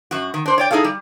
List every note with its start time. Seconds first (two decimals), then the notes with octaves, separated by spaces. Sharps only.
0.11 F#2 F#4
0.34 D#3
0.46 D4 C5
0.58 C#5 D5 G5
0.71 D#4 E4 G#4 A4 F5
0.84 G3